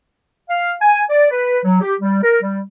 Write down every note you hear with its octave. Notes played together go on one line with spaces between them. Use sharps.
F5
G#5
D5
B4
F#3
G4
G3
A#4
G3